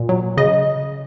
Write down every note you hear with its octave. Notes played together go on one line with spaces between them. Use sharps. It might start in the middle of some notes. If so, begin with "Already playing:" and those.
Already playing: A#2
F#3
C#3 D#5